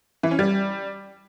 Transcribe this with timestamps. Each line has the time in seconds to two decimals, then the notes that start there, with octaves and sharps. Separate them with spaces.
0.23 E3
0.31 C#4
0.39 G3